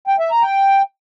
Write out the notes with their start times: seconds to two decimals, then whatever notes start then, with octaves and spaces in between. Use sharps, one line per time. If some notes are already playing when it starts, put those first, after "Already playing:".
0.07 G5
0.19 E5
0.31 A#5
0.43 G5